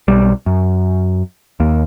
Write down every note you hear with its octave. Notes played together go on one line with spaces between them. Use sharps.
B1 G3
F#2
D#2 A#3